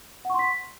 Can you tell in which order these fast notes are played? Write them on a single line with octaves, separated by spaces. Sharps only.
F#5 C#6 C6 B6